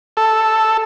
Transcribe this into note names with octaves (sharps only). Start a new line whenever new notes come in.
A4